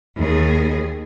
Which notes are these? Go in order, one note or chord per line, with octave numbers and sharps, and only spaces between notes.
D#2 G#4